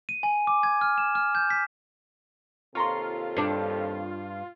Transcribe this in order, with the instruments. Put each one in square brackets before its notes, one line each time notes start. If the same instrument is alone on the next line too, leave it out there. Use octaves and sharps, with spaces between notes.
[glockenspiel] D#7
G#5
D6
G#6
F6
E7
F6
G6
B6
[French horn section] D#2 C3 A4 [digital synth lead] F4 [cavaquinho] C#5 A#5 C6
[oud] G2 D4